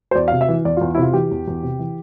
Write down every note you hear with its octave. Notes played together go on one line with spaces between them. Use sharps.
C5
E2 D5
C3 F5
E5
E3
E2 D5
E2 F4
E4
C3 F4
E3 G4
E2
E2
C3
E3